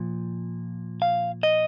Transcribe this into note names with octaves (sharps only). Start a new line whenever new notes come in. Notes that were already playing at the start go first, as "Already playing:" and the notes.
Already playing: A#2 F3
F5
D#5